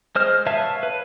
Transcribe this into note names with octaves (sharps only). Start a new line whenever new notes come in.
G#3 C5 F6
B4 C#5 E5 F5 A5
B4